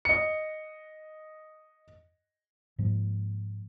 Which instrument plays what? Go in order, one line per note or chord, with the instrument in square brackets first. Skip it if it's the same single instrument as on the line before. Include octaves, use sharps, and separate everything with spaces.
[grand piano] D#5 C#7
[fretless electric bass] G#2 F3 G#3 A#3